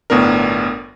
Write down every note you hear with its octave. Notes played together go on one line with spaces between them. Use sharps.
G1 A2 B3 D4 A#4